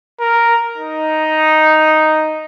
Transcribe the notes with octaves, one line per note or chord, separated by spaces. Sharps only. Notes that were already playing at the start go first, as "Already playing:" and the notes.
A#4
D#4